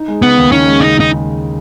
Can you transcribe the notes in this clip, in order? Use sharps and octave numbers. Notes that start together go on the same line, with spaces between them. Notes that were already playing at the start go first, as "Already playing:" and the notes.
Already playing: D#4
G#3
C#3 B3
D#2
C#4 D#4
G#3
C#3 D#4
D#2
D#4